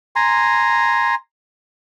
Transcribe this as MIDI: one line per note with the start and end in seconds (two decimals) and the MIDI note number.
0.16 1.15 80
0.16 1.15 82
0.16 1.15 84